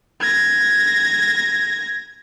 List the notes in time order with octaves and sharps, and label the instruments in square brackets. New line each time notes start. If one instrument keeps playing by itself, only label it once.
[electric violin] G#6 A#6